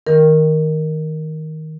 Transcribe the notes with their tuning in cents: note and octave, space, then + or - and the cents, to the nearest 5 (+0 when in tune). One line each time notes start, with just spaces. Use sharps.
D#3 +15 A#4 +0